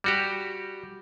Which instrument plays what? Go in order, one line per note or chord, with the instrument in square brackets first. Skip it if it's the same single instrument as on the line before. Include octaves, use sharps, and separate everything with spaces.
[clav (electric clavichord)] G3 F#4 G4